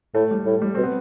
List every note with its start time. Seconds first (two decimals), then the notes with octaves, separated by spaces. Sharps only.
0.15 A2 A3
0.31 G3
0.46 A2
0.62 G3
0.75 B2 C4
0.84 B3